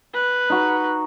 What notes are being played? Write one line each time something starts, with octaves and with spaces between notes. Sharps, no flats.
B4
D#4 F#4